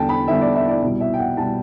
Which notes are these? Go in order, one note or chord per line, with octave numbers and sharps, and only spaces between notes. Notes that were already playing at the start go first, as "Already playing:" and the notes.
Already playing: E2 D3 G3 G5 A5
B5
E2 D3 G3 E5
D5
E5
D5
C2 B2 G3
E5
G5
F#5
B2 G3 A5